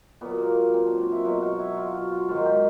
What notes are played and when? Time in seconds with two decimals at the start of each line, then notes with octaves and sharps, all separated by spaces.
0.21 A#2 F#3 B3
0.38 A#3
0.74 C4
0.86 D4
0.99 F#4
1.12 E4
1.25 B2 F#3 F4
1.42 F#4
1.59 E4
1.77 F4
1.94 F#4
2.11 F4
2.28 G#2 D#3 F#3 F4
2.45 G4